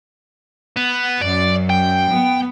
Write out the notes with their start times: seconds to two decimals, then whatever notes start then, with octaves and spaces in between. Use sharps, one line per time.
0.77 B3
1.21 F#2 D5
1.70 G5
2.11 B3